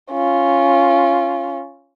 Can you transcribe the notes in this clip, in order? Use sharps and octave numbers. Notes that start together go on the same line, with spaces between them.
C#4 F4